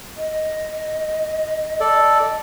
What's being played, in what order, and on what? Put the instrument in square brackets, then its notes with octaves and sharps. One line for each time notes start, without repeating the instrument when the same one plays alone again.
[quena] D#5
[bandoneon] A4 D5